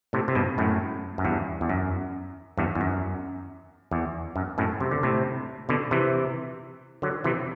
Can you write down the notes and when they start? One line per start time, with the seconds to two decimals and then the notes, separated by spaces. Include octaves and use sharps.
0.13 A2 C3
0.28 C3
0.35 G2 B2
0.58 F#2 A2
1.18 F#2
1.25 E2 G2
1.61 E2
1.69 F#2
2.58 E2 G2
2.75 E2
2.81 F#2
3.91 E2
4.36 F#2
4.58 F#2 A2
4.80 C3
4.91 D3
5.03 A2 C3
5.69 B2 D3
5.91 C3 E3
7.02 D3 F#3
7.24 C3 E3